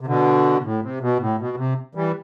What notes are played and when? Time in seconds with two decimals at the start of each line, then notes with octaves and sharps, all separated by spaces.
0.01 C3
0.06 B2 D3
0.64 A2
0.82 C3
1.01 B2
1.19 A2
1.39 B2
1.57 C3
1.95 E3 G3